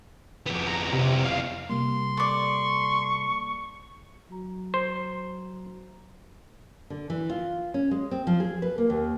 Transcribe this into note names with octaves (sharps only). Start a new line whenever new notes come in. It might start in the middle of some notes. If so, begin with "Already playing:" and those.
F2 B3
A#5
C3
F5
C3 G3 A#3 C6
A4 D5 C#6
F#3 F#4 A#5
C5
D3
E3
F4
C#4
G#3
C4
F3
G#4
B4
A#3
D#2